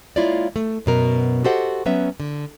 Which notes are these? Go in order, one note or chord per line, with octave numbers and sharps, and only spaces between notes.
G#3 A#3 E4 F4 C#5 D5
A3
F#2 B2 A#4
F#4 G4 A4 C5 D#5 F#5
F#3 B3 C#4 E5
D3